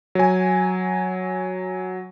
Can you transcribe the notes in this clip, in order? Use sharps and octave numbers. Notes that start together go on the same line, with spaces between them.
F#3 G#5